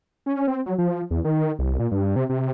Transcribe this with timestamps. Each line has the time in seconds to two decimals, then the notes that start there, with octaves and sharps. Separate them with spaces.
0.26 C#4
0.48 C4
0.66 F#3
0.78 F3
1.11 E2
1.25 D#3
1.59 C2
1.79 A#2
1.91 G2
2.16 C3
2.29 C3